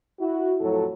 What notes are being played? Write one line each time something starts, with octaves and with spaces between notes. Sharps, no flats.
E4 F#4
F2 A2 F#3 A4